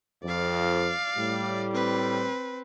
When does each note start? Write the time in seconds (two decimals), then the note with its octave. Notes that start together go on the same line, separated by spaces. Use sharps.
0.24 F2 D5 F5
1.16 A2 G3
1.73 C4 B4